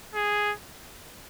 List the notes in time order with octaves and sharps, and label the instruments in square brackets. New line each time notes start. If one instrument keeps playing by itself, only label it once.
[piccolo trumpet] G#4